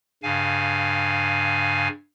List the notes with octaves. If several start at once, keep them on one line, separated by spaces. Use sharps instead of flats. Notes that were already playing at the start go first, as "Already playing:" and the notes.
G2 C#3 F5 G#5